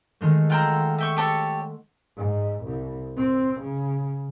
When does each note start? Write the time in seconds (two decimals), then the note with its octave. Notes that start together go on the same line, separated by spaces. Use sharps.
0.21 D#3 G#3 A3
0.50 F4 F#5 G5 A#5 C6 E6
0.98 E5 G5 C#6
1.17 G4 A4 C#5
2.16 G#2
2.64 C2
3.17 C4
3.61 C#3